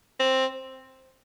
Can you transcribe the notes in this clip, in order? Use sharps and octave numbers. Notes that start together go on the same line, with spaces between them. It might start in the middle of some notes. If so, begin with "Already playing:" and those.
C4